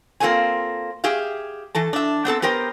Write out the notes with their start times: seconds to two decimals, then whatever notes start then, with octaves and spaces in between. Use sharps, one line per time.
0.20 A#3 C4 F4 A4 C#5 G#5
1.04 G4 G#4 E5 F5
1.75 E3 A4 A5
1.93 D4 E5
2.25 B3 C4 A4 A5
2.42 B3 G4 A#4 C5 G5